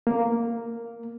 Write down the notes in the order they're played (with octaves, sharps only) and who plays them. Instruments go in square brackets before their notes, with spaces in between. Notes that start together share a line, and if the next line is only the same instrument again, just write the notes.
[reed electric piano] A#3